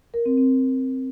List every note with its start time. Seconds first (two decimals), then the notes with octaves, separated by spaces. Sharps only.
0.14 A#4
0.26 C4
0.38 C4